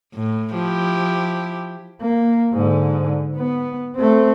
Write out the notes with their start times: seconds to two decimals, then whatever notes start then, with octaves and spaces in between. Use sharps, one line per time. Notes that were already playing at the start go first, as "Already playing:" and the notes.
0.14 A2
0.54 F3 E4 G4
2.01 A#3
2.52 G#2 D3
3.35 B3
3.96 A3 C4